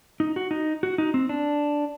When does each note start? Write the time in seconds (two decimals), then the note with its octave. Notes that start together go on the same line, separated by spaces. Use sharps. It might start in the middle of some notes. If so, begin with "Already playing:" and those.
0.20 D#4
0.36 F#4
0.51 D#4
0.83 F#4
0.98 D#4
1.14 C4
1.29 D4